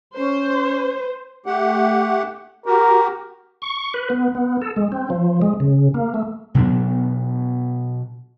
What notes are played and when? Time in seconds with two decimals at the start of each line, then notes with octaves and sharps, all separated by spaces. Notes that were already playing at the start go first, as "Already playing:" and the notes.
0.17 C#4 C5
1.46 A3 G4 F#5
2.66 F#4 G4 A#4
3.62 C#6
3.94 B4
4.10 B3
4.35 B3
4.61 A4
4.76 G#3
4.92 C4
5.10 F3
5.42 G#3
5.60 C#3
5.94 A#3
6.14 A3
6.54 B2 F#3 B3 D4